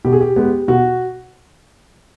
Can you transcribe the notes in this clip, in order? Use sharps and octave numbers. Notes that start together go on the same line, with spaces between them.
B2 G4
G#4
G4
G#3 B3 G4
B2 F#4